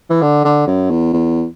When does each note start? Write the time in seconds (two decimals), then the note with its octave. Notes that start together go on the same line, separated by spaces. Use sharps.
0.10 E3
0.22 D3
0.45 D3
0.67 F#2
0.91 E2
1.13 E2